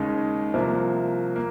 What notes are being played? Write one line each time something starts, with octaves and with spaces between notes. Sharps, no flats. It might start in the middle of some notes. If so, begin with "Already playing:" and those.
Already playing: D#2 C#3 G#3 D#4
C2 C3 F3 A#3
A#3